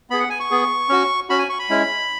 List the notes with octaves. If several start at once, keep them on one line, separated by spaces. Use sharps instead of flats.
B3 G#4 B5
F#5
G#5
C#6
B3 G#4
C#4 F#4
C#4 F#4 B5
G#5
C#6
B5
G#3 C#4 E4